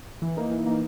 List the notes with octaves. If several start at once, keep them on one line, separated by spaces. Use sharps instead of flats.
E3
A#3 D#4
E3
A#3 D#4